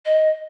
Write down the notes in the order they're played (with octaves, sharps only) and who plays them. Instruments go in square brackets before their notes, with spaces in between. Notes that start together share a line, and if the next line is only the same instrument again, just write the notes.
[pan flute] D#5